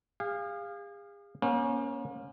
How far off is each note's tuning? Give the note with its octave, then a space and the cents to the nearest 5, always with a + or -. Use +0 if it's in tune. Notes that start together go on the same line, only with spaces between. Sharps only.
G#4 -40 F5 +0
A#3 +40 C#4 +0 C5 +30